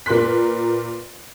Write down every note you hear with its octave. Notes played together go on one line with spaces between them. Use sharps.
A#2 A#4 B4 C6 F#6 B6